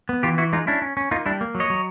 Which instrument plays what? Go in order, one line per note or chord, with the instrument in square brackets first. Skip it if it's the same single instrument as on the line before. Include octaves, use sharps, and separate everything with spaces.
[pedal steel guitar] B3
E3 F4 G4
E3 E4 F#4
G#3 D#4 F4
C#4 D4 E4
C#4
C#4
A#3 D#4 F4
G3 D4 E4
A#3
F#3
C#5 D#5
F#3